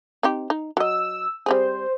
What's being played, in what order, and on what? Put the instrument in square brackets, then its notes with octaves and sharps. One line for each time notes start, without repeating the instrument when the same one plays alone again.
[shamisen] C4 D#4 G4
D#4
[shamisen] F#3 D#5 [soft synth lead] E6
[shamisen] G3 C4 G#4 [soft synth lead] C5